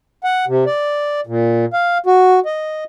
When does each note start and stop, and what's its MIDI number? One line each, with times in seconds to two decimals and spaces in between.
0.24 0.45 78
0.48 0.64 48
0.66 1.21 74
1.27 1.65 46
1.73 1.98 77
2.06 2.40 66
2.46 2.84 75